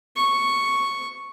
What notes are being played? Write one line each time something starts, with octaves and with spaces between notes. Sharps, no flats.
C#6